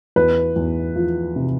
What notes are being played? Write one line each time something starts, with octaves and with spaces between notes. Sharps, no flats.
E2 B4
E2
F3
C3